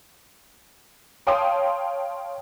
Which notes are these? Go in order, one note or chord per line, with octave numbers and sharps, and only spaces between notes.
C#5 F5 G5 A5 C6 D#6